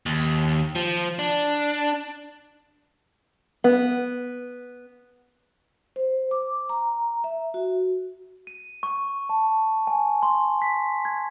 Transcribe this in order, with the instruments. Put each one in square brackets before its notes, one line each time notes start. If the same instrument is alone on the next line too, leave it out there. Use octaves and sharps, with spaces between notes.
[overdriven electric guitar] D#2
F3
D4
[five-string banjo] B3
[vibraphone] C5
D6
A#5
E5
F#4
[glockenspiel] D#7
C#6
A5
G#5
C6
B6
G#6